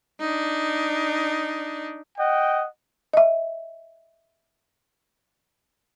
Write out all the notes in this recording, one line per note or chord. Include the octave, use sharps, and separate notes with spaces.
D4 D#4
D#5 F#5 G5
D#5 E5